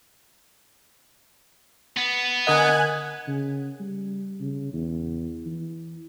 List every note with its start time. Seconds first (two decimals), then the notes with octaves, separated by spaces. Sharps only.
1.97 B3
2.47 D3 A#4 D#5 F#5 G#5 D#6 F#6 G#6
3.28 C#3
3.80 G3
4.40 C#3
4.73 E2
5.46 E3